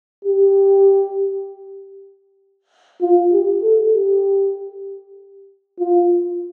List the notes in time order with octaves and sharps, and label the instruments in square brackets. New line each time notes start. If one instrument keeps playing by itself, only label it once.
[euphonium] G4
F4
G4
A4
G4
F4